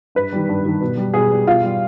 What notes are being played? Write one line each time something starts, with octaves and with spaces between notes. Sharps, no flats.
G2 B4
D#3 G3
G2
D#3 G3
B2
G3
B2 G#4
G3
B2 F4
G3